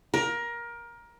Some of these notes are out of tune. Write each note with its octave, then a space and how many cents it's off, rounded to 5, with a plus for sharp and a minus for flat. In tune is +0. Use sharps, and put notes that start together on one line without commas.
A#4 +20